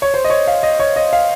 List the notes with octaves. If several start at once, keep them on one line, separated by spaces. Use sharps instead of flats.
C#5
C5
D#5
C#5
F5
D#5
C#5
D#5
F5